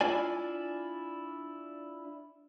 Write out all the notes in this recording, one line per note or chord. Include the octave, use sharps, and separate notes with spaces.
D4 E4 F4 D5 G#5